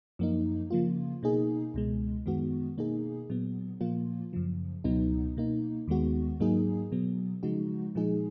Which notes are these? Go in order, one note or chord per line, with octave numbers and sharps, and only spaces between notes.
F#2 F3 A#3 D#4
C#3 F3 A#3 F4
B2 A#3 D#4 G#4
C#2 B2 G#3
F#2 D#3 G#3 B3 F#4
B2 A#3 D#4 G#4
A#2 F#3 B3
A#2 F3 A#3 F4
F#2 C#3 F3
C#2 B2 F#3 B3 D#4
B2 A#3 D#4
D#2 D#3 G#3 B3 F#4
G#2 F#3 A#3 D#4 G#4
B2 F#3 B3
C#3 F3 G#3 D#4 F#4
A#2 F3 G#3 D#4 G#4